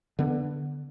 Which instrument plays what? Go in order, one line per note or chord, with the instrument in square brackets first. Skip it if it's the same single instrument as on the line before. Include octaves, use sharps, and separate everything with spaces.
[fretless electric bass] D3 B3